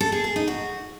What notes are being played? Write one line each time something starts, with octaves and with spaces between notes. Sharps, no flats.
A4
G#4
G#4
D#4
F#4